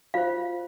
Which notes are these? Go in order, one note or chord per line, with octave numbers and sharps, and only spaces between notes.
F4 C5 F5